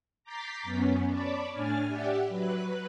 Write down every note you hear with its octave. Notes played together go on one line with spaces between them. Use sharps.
A#5 D6 G6 A6 B6 C7
F#2 B3 C#4
C#5 D5 A5 B5 D6
A2 D4 G#5 F6 A6
G4 D5 E5 F#5
F#3 B4 F#6